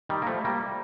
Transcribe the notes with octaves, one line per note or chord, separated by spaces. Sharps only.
D#3 G3
A#3
F3 A3
G3 A#3